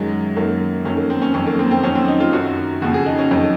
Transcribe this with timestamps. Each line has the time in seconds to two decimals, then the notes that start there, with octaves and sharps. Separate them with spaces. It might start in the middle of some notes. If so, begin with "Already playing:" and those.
Already playing: F#2 D#3 F#3 G#3
0.36 F#2 D#3 F#3 A#3
0.85 F2 D#3 F#3 C#4
0.97 A#3
1.10 C4
1.22 C#4
1.34 F2 D#3 F#3 C#4
1.47 A#3
1.59 C4
1.71 C4
1.83 F2 D#3 F#3 C#4
1.95 C4
2.08 D#4
2.20 F4
2.33 F#2 D#3 F#3 F#4
2.82 F2 C#3 F3 F#4
2.94 G#4
3.06 D#4
3.18 C#4
3.30 F2 D#3 F#3 D#4